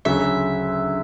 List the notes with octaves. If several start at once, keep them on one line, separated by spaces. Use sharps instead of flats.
D2 C#3 F#3 E5